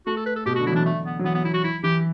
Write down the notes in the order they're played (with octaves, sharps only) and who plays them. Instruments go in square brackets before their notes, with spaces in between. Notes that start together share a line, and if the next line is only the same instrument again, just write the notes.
[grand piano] A3 [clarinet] F#4
[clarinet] A4
B4
A4
[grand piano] B2 [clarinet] G4
[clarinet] F#4
[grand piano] D3
[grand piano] F#3 [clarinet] E4
[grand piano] E3 [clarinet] D4
[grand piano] D3 [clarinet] A3
[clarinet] B3
[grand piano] F#3
[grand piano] E3 [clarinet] B3
[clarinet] B3
E4
F#4
E4
[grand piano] E3 [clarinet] G4